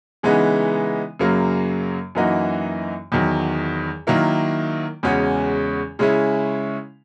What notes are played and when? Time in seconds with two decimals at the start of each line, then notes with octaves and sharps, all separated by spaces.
0.23 C#3 E3 G#3 B3 D#4
1.19 F#2 C#3 F#3 A#3
2.15 F#2 E3 A#3 D#4 F#4
3.12 E2 D#3 F#3
4.07 D#3 F#3 A#3 E4
5.03 E2 C#3 G#3 C#4 F#4
5.99 C#3 G#3 C#4 E4